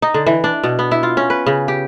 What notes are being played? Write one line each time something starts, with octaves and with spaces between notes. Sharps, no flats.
D#4
D3
E3
D4
B2
B3
E4
F4
C#4
B4
C#3
G4